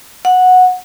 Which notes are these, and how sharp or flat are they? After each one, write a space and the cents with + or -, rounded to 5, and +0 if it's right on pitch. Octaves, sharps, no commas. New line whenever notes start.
F#5 -10